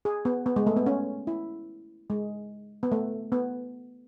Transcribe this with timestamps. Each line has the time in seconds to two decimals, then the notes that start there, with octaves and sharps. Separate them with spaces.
0.05 G#4
0.25 B3
0.46 B3
0.56 G#3
0.67 A3
0.76 B3
0.86 C#4
1.27 E4
2.10 G#3
2.83 B3
2.92 A3
3.32 B3